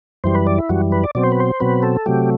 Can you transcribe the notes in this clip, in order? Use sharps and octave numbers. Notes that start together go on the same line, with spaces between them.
F#2 E3 G3 C5
B4
D5
E4
F#2 E3 G3 F#4
B4
D5
B2 F#3 C4 D5
C5
B4
C5
B2 F#3 C4 B4
A4
C3 F#3 A3 G4